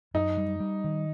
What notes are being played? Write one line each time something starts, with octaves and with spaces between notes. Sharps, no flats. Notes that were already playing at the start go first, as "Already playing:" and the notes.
F#2 D#4
G3
G3
D#3